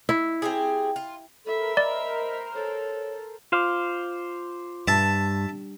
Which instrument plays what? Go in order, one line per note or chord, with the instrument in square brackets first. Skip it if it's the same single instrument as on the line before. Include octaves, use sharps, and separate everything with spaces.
[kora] E4
[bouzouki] C4 G4 G#4
F4
[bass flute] A4 [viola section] A#4 C5 [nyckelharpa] E5 B5
[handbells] D5 [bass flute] D#5
[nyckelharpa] A4 [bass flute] C#5
[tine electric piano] F4 D6 [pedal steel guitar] C5 F5
[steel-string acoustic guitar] G2 [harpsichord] E5 A5